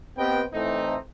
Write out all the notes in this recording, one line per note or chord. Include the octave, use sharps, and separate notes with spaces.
B3 C4 G4 B4 D#5 G5
A2 E3 A3 C4 D#4